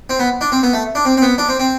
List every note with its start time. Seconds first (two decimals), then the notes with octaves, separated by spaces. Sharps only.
0.10 C4
0.20 B3
0.41 D4
0.52 C4
0.63 B3
0.73 A3
0.95 D4
1.05 C4
1.17 C4
1.22 B3
1.38 D4
1.49 C4
1.60 C4